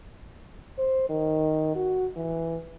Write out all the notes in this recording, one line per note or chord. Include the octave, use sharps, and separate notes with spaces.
C5
D#3
F#4
E3